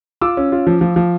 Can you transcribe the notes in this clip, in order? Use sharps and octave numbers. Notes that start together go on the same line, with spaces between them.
F4 D6 E6
C#4
F4
F3
F3
F3